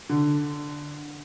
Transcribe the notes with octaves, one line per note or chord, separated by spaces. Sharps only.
D3